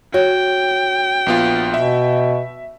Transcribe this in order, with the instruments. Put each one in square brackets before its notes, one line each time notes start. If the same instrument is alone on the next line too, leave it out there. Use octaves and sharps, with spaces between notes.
[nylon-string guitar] F#4 C#5 [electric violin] G5
[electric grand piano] A#1 B3 F4
[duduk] B2 [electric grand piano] E5